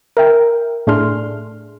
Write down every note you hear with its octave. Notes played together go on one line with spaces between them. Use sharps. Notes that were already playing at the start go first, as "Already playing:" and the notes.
A#4 E5 G5
A2 A3 D4 G#4 C6 F6